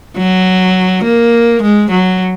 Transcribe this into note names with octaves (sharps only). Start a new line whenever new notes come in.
F#3
A#3
G#3
F#3